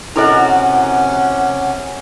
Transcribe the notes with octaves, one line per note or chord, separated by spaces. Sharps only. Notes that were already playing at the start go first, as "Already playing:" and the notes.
C3 C#4 E4 F#4 A4 A#4 D#5 F#5